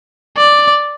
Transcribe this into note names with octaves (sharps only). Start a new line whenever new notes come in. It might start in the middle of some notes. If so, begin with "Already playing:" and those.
D5